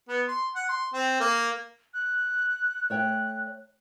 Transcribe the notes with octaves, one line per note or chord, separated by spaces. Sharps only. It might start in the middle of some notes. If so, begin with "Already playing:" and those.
B3
C6
F#5
C6
C4
A#3
F#6
A3 C#5 G5 F#6